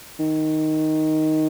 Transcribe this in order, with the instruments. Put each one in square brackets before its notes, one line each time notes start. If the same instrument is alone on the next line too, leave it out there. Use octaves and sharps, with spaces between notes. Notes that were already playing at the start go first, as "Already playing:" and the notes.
[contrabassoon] D#3